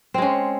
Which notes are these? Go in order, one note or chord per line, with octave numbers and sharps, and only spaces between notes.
G#3 C4 C#4